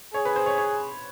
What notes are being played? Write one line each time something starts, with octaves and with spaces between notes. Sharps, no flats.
G#4 C#5
B4
C5
C#5
C#5